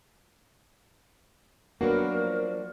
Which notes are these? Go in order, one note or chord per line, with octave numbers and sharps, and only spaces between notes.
F#3 A#3 B3 D4 F#4 A#4
F3